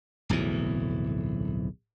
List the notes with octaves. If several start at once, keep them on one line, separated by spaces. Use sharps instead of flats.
D1 B1 F2 E3